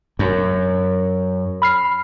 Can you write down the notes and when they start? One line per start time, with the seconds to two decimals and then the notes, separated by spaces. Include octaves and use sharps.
0.19 F#2
1.62 B5 F6 C7